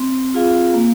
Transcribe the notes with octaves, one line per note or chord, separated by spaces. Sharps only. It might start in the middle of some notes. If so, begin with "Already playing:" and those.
Already playing: C4
F4 G#4 F5
A#3